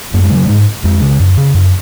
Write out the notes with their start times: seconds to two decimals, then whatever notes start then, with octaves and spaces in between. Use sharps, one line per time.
0.14 F#2 A#3
0.23 G#3
0.31 C#3 F#3
0.44 G#2 G#3
0.84 F2 G#3
1.02 C#3
1.19 F#2
1.38 C#3
1.54 F#2